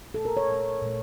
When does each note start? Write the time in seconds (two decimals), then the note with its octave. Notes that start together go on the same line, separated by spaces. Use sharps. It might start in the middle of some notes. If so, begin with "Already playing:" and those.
0.14 A#2 A3 A4
0.25 A#4
0.37 C#5
0.48 A#2 A3
0.82 A#2 A3